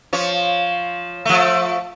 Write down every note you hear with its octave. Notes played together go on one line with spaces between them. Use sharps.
F3 C#5
F3 A3